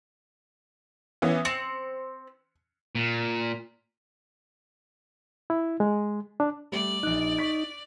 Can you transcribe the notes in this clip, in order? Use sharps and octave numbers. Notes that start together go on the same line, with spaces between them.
E3 B3 C#4
C4 C#7
A#2
E4
G#3
D4
G3 A3 D5
A#1 D#4 F#6
C#6 B6